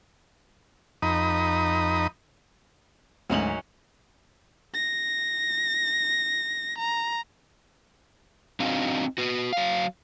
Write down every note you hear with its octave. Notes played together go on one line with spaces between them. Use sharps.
F2 D#4 A#5 B5 D#6
D2 G#2 F#3 C#4 D#4 F#7
A#6
A#5
C4 D4 D#4 F#4 F5
F#4 B4
F#3 F5